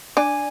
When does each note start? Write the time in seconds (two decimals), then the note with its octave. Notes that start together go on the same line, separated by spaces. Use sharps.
0.17 D4 D5 G#5